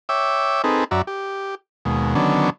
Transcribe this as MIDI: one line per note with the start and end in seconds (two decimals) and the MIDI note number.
0.09 0.62 73
0.09 0.62 76
0.09 0.62 79
0.09 0.62 86
0.09 0.62 88
0.64 0.84 60
0.64 0.84 63
0.64 0.84 68
0.64 0.84 69
0.64 0.84 71
0.91 1.02 42
0.91 1.02 66
0.91 1.02 74
0.91 1.02 76
0.91 1.02 82
1.07 1.55 67
1.85 2.14 39
1.85 2.14 47
1.85 2.14 56
2.15 2.50 50
2.15 2.50 51
2.15 2.50 54
2.15 2.50 59
2.15 2.50 61
2.15 2.50 62